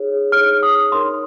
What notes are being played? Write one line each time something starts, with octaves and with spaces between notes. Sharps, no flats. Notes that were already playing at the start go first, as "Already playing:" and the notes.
Already playing: D#4 G#4 C#5
D#4 G#4 C#5 F6
D#6
D#4 A#4 C#5 C6